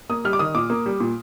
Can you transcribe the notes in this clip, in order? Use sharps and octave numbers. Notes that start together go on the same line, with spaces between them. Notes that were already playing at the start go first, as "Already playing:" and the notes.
A#3 D#6
G3 F6
D6
D#3 D#6
A#2 D6
A#3
G3
A#2